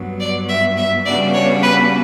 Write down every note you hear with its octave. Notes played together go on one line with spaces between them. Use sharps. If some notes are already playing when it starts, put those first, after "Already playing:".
Already playing: G2 F#3 B3
D5
E5
E5
C#3 G3 B3 D4 F#4 D5
C#5
B4